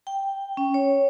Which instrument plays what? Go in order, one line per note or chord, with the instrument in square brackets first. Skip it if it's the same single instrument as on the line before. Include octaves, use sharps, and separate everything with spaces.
[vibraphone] G5
C#4
C#5